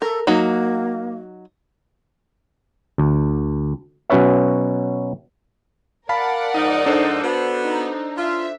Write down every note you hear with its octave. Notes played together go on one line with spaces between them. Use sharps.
A4 A#4
F#3 A#3 D#4 F#4
D2
B2 F#3 C#4 B4 C#5 E5
A#4 D5 F5 F#5 A5 B5
G#2 F3 D#4
D4 A4 C5
B3 F#4
D#4
F4 E5